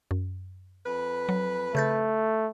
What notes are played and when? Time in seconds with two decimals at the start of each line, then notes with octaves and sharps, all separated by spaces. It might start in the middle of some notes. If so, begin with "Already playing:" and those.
0.11 F#2
0.85 F2 B4
1.29 F#3
1.75 C#3 A3 G6 A6